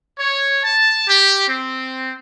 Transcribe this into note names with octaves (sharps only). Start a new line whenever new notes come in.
C#5
A5
G4
C4